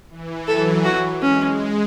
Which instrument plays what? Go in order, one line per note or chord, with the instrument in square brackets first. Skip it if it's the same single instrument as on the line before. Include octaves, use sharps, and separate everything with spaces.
[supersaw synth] E3
[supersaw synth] F#3 [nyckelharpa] A4
[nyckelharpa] F#4
[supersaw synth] G#3 [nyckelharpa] C#4